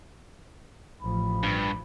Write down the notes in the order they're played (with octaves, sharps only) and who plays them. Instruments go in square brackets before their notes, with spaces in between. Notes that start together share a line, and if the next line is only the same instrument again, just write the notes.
[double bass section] A1 F3 [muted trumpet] B5
[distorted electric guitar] G2